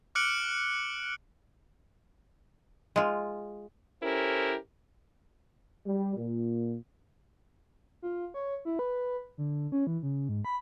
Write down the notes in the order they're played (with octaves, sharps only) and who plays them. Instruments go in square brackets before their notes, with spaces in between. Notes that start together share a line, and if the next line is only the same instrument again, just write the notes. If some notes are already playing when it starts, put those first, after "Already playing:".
[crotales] D6 F6 F#6 C#7 D7 F#7
[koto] G#3 F4
[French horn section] C#4 E4 G4 A4 A#4 C5
[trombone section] G3
A#2
[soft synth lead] F4
C#5
E4
B4
D3
C#4
E3
C#3
G#2
B5